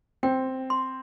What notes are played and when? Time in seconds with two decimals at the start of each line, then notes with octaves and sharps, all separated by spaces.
0.23 C4 G5
0.70 C6